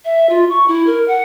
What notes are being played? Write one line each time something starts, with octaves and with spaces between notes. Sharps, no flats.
E5
F4
C#6
E4
A#4
F#5